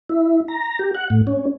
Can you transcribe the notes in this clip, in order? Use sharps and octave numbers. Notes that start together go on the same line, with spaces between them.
E4
A#5
G4
F#5
A2
C#4